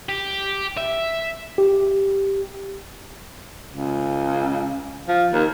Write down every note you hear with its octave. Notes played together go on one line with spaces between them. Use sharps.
G4
E5
G4
C#2
F3
D#2